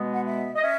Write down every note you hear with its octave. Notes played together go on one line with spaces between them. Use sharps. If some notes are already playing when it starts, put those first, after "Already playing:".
Already playing: B2 G#3 B3
F#5
E5
D#5
C#4 E5